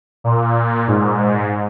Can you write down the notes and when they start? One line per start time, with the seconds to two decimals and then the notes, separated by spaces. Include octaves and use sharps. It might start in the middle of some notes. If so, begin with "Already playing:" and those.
0.24 A#2
0.88 G#2